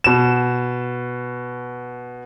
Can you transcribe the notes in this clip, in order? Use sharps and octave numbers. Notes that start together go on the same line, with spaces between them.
B2 E7